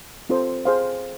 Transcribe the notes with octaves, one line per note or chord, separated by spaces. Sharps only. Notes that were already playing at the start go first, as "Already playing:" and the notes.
C4 F4 A4 C5
G#4 C5 F5